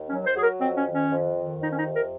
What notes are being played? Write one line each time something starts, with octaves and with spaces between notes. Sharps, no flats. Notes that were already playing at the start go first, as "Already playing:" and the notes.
Already playing: D#2
F#3 C#4
C5
F#3 G#4
A#4
F2 C4
C#4
D#3
C#4
F2
D#3
F2 D#4
C#4
D#4
C3
A#4